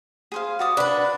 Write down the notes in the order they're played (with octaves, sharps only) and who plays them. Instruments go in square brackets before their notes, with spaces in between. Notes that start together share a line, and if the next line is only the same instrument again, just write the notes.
[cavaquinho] G#4 C5 F5
F#4 D5 D#6
[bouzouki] D4 B4 [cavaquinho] B5